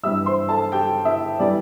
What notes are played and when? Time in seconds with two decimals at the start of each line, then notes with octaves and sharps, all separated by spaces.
0.03 G2 E3 G3 E5 E6
0.26 C5 C6
0.49 A4 A5
0.72 G4 G5
1.05 E4 E5
1.39 E3 G3 D5